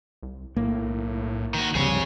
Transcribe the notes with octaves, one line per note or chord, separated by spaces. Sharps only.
C2
B1 A2 A#3
D#3 F#4
C#2 G2 C3 F3 G3 G#4 C#5